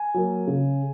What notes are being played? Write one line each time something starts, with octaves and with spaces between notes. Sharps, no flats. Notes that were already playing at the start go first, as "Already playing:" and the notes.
Already playing: G#5
F#3 A#3
C#3